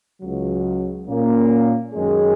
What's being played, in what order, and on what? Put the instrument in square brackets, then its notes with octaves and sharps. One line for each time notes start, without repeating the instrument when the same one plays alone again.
[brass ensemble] C#2 C#3 F#3
A#2 A#3 C#4
F#2 D#3 G#3 C#4 G#4